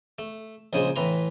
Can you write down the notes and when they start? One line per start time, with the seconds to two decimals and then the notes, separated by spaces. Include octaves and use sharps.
0.19 A3
0.73 A#1 C#3 G#3 G#4 C5
0.96 A2 E3 B4 A#5 C6